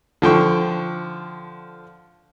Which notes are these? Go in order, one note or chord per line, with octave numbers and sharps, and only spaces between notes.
D3 F3 G5 C#6